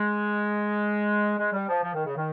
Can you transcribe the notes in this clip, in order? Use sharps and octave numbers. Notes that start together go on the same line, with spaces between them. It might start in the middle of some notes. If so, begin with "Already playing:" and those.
Already playing: G#3
G#3
G3
F3
F3
D#3
C#3
D#3